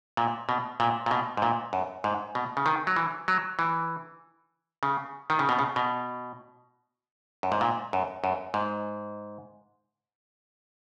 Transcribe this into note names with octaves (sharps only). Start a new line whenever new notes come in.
A#2
B2
A#2
A#2
B2
G#2
A#2
F#2
G#2
B2
C#3
D#3
F#3
E3
F#3
E3
C#3
D#3
C#3
B2
C#3
B2
F#2
G#2
A#2
F#2
F#2
G#2